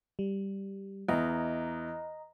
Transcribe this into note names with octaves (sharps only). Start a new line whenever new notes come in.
G3
E2 D#5 A#5